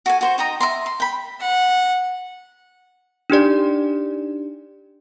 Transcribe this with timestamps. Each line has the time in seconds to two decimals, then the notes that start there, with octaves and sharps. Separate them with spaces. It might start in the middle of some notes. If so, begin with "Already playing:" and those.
0.06 F#4 A4 G#5
0.21 F#4 C5 C#6
0.38 D#4 G5 A#5 D#6
0.60 E5 A#5 C6
0.86 C6
1.00 G5 B5
1.40 F#5
3.30 D4 D#4 G4 D5